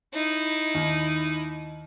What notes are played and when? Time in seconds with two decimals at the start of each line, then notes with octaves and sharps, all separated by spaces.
0.13 D#4 E4
0.75 D#2